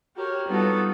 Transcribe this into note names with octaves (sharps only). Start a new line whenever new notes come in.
F#4 G4 A#4 C#5
G3 B3 D#4 F4 F#4 A4